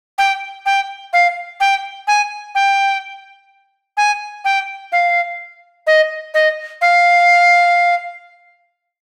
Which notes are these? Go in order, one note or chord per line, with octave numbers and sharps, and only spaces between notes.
G5
G5
F5
G5
G#5
G5
G#5
G5
F5
D#5
D#5
F5